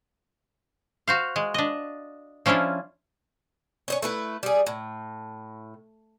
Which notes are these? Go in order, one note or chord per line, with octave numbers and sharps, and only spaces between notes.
F#4 C5 F5
G#3
D4 D#5
F3 C#4 D4 E4 F4
C#4 D#4 C#5
A3 E4 B4
G3 G#4
A2